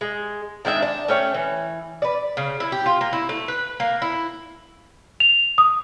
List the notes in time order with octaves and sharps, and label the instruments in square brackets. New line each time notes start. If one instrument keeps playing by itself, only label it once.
[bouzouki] G#3
D#3 G#3 D4 E5
D4
A3 C#4 C#5 G5
E3
B4 D5
C#3
E4
G4
F4
A#3
E4
A3
B4
A#3
E4
[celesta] F7
D#6